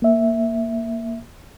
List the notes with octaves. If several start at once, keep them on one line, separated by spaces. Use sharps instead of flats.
A#3 E5